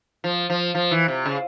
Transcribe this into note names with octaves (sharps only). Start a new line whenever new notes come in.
F3
F3
F3
E3
C3
C#3